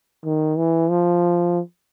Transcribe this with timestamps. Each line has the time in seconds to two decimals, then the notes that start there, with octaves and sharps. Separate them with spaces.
0.25 D#3
0.58 E3
0.90 F3